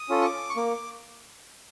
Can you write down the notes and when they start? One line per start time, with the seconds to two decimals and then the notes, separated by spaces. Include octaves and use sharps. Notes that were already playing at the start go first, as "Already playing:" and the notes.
Already playing: D#6
0.09 C#4 F4 A4
0.21 C#6
0.25 D6
0.49 C#6
0.56 A#3 D6